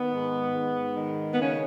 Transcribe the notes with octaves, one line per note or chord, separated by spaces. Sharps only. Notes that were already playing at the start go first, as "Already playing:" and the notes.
Already playing: D#3 B3
G#2
G#2
D#3
B3
C#3 C#4